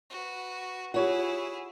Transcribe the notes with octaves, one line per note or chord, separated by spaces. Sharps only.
F#4 B4
E4 F4 G4 G#4 C#5 F#5